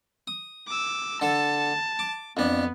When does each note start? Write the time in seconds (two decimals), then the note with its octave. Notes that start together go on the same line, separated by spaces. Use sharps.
0.27 D#6
0.67 D6 E6
1.21 D3 A4 A5
1.99 D6
2.37 F2 B3 D4